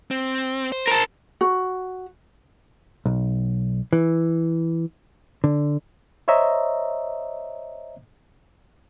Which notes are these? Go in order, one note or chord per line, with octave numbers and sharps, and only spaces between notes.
C4
C5
A#4 A5
F#4
B1
E3
D3
C5 C#5 D#5 E5 A#5